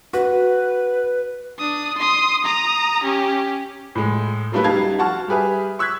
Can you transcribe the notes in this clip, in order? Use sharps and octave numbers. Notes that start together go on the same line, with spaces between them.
F#4 B4
D4 D#6
C6 D#6
A#5 D#6
C#4 G4
A2 G#3
F#3 G3 A3 A#3 E4 B4
C#2 G3 D#4 F5 A5 G#6
F#4 F#5 A5 C#6 F6
G3 G4 G#4 B4 E5
C#6 E6 F#6 G#6 B6